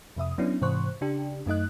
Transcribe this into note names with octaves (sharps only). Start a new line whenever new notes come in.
F2 C3 E5 D#6
F#3 B3 C#4 D4 E4
G#2 C3 E3 C5 C#6 F#6
C#3 D4 G4
F#2 A3 D#4 D#5 F#6